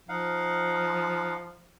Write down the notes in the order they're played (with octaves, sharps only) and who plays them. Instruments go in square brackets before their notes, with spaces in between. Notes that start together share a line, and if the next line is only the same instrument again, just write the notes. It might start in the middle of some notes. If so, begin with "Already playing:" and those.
[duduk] F3 [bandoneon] D#4 F5 F#5